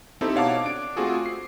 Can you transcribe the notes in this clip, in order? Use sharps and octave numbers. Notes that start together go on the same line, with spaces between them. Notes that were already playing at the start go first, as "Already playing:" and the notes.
C4 D#4 E4 G4 A4
B2 C#5 F5 F#5 A5 D6
D4 D7
A3 C4 F4 F#4 G#4 A4
C7